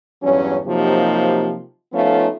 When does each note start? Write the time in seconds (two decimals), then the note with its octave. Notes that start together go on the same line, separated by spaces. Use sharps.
0.23 E2 G2 F#3 C#4
0.66 C3 F3 F#3 A#3 D#4 G4
1.93 F3 A3 B3 C#4 D#4 F4